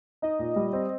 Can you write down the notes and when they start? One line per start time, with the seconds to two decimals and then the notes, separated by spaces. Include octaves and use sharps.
0.22 D#4 D#5
0.39 A#2
0.56 G3
0.73 C4